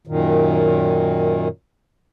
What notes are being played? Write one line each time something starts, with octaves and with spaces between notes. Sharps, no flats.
F#2 A#2 D#3